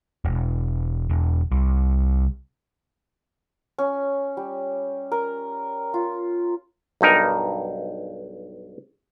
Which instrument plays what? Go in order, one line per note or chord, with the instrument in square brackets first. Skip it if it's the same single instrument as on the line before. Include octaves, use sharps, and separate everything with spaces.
[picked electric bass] E1
E1
C2
[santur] C#4
G3
A#4
F4
[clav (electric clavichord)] B1 G2 D#4 A#4